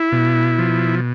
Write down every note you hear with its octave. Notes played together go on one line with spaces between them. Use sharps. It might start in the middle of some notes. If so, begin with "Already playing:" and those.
Already playing: E4
B2
F3